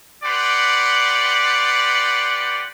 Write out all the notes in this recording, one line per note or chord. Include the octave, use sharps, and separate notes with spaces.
G4 B4 D5 F#5 C6